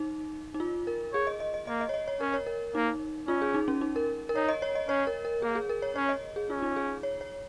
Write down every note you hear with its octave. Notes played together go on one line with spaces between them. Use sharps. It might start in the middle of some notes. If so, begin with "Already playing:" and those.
Already playing: D#4
D#4
F4
A#4
G#4 C#5
D#5
D#5
D#5
A#3 D#5
D#5
C#5
D#5
C#5
C#4 A#4
C#5
A#4
A#3 D#4
C#4 F4
G#4
D#4
C#4
D#4
A#4
A#4
D#4 C#5
D#5
C#5
D#5
C#4 C#5
A#4
A#4
A#3 G#4
G#4
A#4
C#5
C#4 C#5
D#5
G#4
C#4 F4
D#4
G#4
C#5
C#5